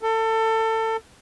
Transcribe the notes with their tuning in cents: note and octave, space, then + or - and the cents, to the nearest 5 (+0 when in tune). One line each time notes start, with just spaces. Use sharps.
A4 +25